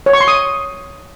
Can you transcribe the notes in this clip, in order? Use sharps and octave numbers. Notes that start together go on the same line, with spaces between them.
C#5
C#6
C6
D#6